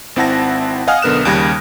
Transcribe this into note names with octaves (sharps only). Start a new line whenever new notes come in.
G#1 C4 E4 F#5 A5 A#6
D#5 F5 F#5 G#5 D#6 F6
B1 D3 B3 A#4 F#6 E7
D#2 C#3 G3 B5 G#6 A#6